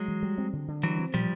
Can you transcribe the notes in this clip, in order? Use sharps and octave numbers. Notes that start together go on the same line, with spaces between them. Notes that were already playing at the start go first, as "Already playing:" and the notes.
Already playing: F#3 G#3
E3
G3
C4
D3
D3
E3 F#3 G3
C4
A#2 F3 G3